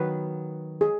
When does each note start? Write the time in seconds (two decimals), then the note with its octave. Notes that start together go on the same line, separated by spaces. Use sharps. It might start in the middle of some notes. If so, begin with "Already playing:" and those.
Already playing: D#3 F#3 B3 B4
0.81 G#4